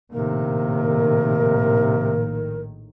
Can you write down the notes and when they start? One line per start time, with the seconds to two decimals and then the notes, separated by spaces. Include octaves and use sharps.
0.13 A#1 A2 C3 D#3 A#3 A#4